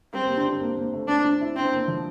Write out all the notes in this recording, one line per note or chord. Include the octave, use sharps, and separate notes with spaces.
G3 C4
A#3
D4
C4
A#3
A#3
A3
C4 D4
D4
E4
C4 D4
A#3
F3